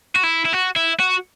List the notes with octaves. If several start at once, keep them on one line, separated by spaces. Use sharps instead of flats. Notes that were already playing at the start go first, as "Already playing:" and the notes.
F#4
E4
E4
F#4
E4
F#4